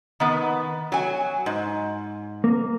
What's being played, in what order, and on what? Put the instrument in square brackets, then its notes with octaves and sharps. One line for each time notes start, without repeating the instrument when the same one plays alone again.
[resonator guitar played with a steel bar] D#3 B3
F#3 G#5
G#2
[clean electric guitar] A#3